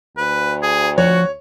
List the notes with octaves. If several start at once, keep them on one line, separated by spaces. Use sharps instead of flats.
D2 B4
G#4
F3 F#4 C#5